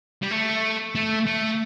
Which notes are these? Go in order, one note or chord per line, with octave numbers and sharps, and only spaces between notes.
G3
A3
A3
A3